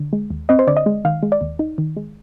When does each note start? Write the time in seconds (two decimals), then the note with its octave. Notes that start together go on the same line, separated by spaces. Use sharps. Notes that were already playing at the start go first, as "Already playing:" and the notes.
Already playing: D3
0.13 G#3
0.30 D#2
0.49 C4 D#5
0.59 C5
0.67 D3 D5
0.77 D#5
0.86 G#3
1.05 D#3 F5
1.23 G#3
1.32 D5
1.41 D#2
1.59 D#4
1.78 D#3
1.97 G#3